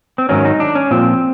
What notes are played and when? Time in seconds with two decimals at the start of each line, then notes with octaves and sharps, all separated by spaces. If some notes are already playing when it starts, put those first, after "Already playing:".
0.18 C4
0.29 G#2 D#3 F#3 C#4
0.45 D#4
0.60 D4
0.75 C#4
0.91 A#2 F3 C4